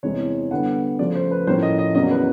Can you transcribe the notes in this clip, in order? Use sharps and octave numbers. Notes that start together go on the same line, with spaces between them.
E2 C3 E3 G#3 C#5
D3 G3 B3 F#5
C#3 F3 A3 D5
C5
B4
A2 F3 A#3 C#4 C5
D#5
D#5
E2 C#3 F#3 A#3 C#4 D#5
B4